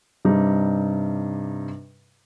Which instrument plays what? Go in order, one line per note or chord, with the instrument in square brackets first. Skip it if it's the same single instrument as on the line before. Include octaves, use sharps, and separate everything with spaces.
[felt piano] G2 C3 G3 D#4